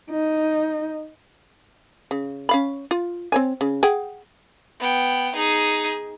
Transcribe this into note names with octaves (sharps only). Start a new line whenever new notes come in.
D#4
C#3
C#4 F5 B5
F4
C4 C#5 G#5
C#3
G#4 F#5 G5
B3 G5
D#4 G#4